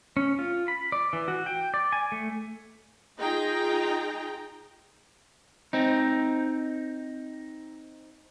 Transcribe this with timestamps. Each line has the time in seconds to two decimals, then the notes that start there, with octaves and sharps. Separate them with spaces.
0.17 C#4
0.39 F4
0.68 B5
0.92 D5
1.13 E3
1.28 F#4
1.46 G5
1.74 D5
1.93 G#5
2.12 A3
3.18 D#4 F4 G#4 G5 A#5
5.73 C4 D#4